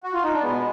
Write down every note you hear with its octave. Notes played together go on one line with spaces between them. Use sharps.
F#4
F4
D#4
D4
B2 G#3 B3